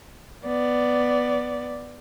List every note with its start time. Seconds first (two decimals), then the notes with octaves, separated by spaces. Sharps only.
0.45 B3 D5